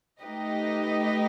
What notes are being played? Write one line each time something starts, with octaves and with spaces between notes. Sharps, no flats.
A3 D#4 G4 B4 D#5